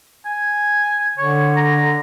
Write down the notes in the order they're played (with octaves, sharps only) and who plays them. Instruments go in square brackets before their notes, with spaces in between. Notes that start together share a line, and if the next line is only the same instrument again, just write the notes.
[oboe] G#5
[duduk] D3 [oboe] C#5
[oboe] A#5